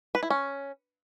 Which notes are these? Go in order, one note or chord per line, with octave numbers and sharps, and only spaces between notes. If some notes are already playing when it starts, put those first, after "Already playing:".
B4
E4
C#4